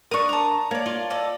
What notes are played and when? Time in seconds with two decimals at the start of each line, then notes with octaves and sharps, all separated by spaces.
0.11 D4 A#4 C#6 D#6
0.29 A5 A#5
0.71 A#3 C#5 D5
0.86 F4
1.10 A4 D5 D#5